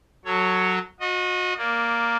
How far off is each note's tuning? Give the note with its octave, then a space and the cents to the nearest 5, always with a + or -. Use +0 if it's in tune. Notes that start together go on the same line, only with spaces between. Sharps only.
F#3 +0 A4 +20 C#5 +5
F#4 -35 D#5 +0
A#3 +0 D5 +0